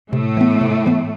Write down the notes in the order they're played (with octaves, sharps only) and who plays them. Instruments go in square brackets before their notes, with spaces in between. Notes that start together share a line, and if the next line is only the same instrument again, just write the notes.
[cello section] A2 A3 [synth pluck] C3
[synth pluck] E3 B3
C3
E3 B3